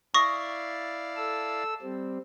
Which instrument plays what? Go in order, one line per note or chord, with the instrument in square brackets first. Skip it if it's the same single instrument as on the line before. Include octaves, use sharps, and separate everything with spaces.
[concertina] E4 D5 F5 [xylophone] C#6 D#6 A#6
[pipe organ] A4 E6
G3 C4